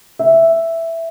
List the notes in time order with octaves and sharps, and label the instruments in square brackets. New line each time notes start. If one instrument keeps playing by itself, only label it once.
[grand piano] E5